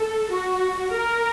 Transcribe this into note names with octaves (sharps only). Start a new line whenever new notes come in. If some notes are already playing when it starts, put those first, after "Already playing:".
Already playing: A4
F#4
A#4